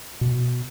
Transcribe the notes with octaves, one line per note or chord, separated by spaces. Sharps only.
B2